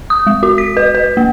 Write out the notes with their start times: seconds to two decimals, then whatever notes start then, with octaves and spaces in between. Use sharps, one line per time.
0.10 D#6
0.27 G#3
0.43 F#4
0.58 B6
0.77 B4
0.95 B4
1.17 A#3